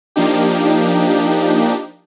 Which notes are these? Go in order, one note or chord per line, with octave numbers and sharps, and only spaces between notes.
F3 A#3 D4 D#4 G4